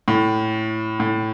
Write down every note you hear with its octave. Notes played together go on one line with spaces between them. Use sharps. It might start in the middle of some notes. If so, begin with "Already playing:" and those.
A2
A2